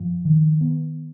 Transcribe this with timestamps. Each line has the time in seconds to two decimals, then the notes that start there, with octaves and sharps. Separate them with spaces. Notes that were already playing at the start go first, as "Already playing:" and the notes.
Already playing: F#2 F3
0.25 D#3
0.61 B3